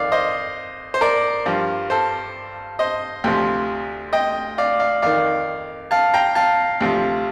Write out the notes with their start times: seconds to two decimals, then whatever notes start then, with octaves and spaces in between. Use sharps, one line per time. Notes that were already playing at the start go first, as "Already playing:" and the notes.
Already playing: F2 D#3 D5 F5
0.12 C5 D#5
0.94 C5
1.01 A#4 D5
1.46 G2 F3
1.90 A4 C5
2.79 C5 D#5
3.24 D2 C3 F3
4.13 D#5 G5
4.58 D5 F5
4.79 D5 F5
5.02 F2 D#3 D5 F5
5.91 F5 A5
6.14 G5 A#5
6.35 F5 A5
6.81 D2 C3 F3